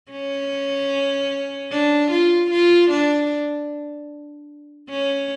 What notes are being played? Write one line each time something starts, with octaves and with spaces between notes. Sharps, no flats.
C#4
D4
F4
F4
D4
C#4